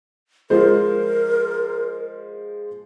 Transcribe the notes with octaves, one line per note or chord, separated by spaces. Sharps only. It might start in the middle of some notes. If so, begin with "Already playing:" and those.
F3 G#3 A#4 C5